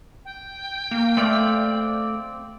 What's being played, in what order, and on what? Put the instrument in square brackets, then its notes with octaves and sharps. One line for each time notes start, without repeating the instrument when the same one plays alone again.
[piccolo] G5
[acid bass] A#3
[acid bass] A3 [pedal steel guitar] C4 D5 F5